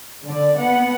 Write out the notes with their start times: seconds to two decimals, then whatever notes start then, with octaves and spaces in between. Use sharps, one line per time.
0.25 D3 D5
0.57 B3 F#5